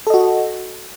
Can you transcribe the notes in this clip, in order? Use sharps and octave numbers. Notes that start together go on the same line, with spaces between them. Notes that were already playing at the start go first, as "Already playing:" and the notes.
F#4 A4 D#5